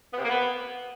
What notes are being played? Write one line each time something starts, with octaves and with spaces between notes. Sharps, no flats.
B3
C3
A#3
B3